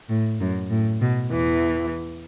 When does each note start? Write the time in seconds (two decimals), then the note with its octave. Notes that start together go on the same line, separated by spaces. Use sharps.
0.08 A2
0.39 F#2
0.70 A2
1.00 B2
1.31 E2 E3